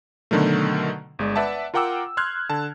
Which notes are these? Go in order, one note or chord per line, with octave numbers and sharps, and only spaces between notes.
B2 D3 D#3 F#3 A3
G1 G#3 D5
B4 D5 E5 F#5 A5
F4 A#4 F#5 G5 D6 E6
C6 F6 F#6 G#6
D3 A5